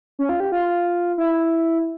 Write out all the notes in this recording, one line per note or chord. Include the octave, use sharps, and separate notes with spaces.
C#4
F4
G4
F4
E4